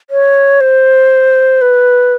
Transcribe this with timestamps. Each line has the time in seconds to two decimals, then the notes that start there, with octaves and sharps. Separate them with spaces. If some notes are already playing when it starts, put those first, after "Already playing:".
0.10 C#5
0.60 C5
1.61 B4